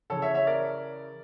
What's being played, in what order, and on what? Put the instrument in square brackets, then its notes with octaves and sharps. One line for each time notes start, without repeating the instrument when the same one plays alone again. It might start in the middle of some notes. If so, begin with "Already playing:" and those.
[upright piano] C#3 E3 A4 C#5
C#5 E5
C#5 E5
A#4 D5